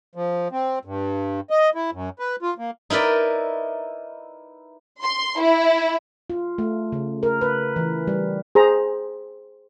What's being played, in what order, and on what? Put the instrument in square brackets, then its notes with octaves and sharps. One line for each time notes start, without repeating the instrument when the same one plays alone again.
[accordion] F3
C4
G2
D#5
E4
F#2
B4
F4
A#3
[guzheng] D#4 E4 A#4 B4 D5
[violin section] C6
E4
[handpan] F4
A3
C#3
A#4
B4
E3
G3
[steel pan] G#4 C5 A#5